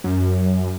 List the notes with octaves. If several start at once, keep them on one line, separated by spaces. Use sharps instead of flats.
F#2